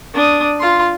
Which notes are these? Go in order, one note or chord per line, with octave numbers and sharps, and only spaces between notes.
D4 D#6
F4 C6